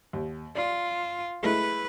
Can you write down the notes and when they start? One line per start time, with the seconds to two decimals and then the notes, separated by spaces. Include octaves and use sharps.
0.13 D#2
0.55 F4 D5
1.43 G#3 A3 E4 B4